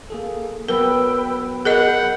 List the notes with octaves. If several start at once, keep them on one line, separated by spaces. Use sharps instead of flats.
A#3 G#4 A4
F#3 B3 A#4 B4 G5 E6
G#4 A#4 D#5 F#5 B5 G6